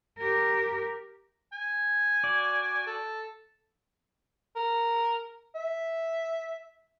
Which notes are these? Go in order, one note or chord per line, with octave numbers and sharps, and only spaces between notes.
G4 A#4
G#5
F#4 D5
A4
A#4
E5